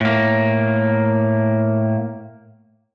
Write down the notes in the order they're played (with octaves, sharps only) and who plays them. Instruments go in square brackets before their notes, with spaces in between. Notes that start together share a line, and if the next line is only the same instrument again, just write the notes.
[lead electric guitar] A2 A#3